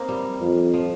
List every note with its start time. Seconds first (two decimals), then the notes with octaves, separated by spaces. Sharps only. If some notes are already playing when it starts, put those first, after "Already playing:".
Already playing: A#3 C4 D#4
0.08 G3
0.41 F2
0.74 F3